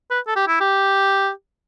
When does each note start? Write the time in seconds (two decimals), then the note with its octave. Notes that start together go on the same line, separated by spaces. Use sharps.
0.11 B4
0.27 A4
0.36 G4
0.48 E4
0.60 G4